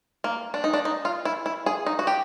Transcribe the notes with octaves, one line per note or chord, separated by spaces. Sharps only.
A#3
D4
D#4
D4
D#4
F4
E4
E4
G#4
D#4
F#4
G4